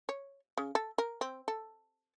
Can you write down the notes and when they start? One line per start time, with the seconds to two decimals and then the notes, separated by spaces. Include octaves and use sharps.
0.09 C#5
0.58 C#3
0.75 A4
0.98 A#4
1.21 C4
1.48 A4